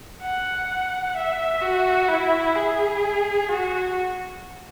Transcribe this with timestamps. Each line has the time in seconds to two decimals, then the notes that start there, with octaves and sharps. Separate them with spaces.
0.22 F#5
1.16 E5
1.62 F#4
2.08 E4
2.56 G#4
3.49 F#4